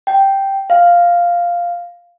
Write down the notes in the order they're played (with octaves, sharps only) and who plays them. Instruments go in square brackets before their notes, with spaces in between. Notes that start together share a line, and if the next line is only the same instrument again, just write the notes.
[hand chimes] G5
F5